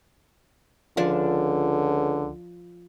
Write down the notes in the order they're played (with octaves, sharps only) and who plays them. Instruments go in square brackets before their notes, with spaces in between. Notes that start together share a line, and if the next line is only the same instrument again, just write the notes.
[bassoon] C#2 [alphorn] D3 [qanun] F3 D4